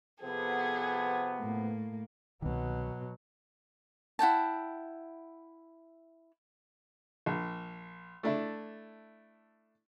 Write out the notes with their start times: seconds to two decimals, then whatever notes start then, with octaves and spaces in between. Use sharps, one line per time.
0.23 C3 F3 B3 G#4 A4
1.38 A2 A#3
2.42 C2 B2 D#3 F#3
4.19 E4 F#5 G5 A5
7.26 A#1
8.23 A3 D4 E4